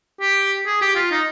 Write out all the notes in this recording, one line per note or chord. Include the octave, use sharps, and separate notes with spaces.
G4
G#4
G4
F4
D#4